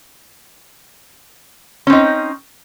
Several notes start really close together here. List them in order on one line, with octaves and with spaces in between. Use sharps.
C#4 C4 D#4